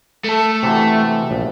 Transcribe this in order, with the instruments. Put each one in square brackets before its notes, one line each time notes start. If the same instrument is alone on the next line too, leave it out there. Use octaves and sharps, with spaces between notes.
[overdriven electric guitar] A3 A4
[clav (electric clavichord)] C3 E3 F#4
A#1